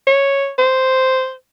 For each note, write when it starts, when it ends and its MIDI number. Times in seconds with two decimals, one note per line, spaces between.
0.07 0.50 73
0.58 1.33 72